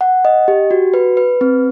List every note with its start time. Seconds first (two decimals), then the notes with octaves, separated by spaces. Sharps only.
0.01 F#5
0.25 D#5
0.48 G4
0.71 F#4
0.94 B4
1.17 B4
1.41 C4